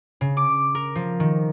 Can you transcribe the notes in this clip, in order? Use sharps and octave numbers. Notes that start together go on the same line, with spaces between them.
C#3
D6
A#4
F3
D#3